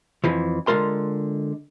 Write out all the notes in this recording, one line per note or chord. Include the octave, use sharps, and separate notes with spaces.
F2 E3 F3
D3 G#3 F4 A#4 C6